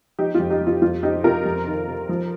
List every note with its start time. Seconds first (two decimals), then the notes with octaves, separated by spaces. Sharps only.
0.19 F3 D#4 G4
0.35 F2 F4
0.50 D#4 G4
0.61 F3
0.67 F4
0.82 F2 F4
1.03 F3 D#4 G4
1.24 C3 F4 A#4
1.45 F2
1.67 D#3
1.88 C3
2.09 F3